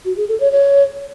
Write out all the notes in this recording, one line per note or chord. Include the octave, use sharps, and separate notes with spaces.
F#4
G#4
A4
C#5
C#5